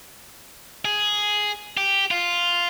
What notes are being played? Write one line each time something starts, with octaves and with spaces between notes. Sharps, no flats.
G#4
G4
F4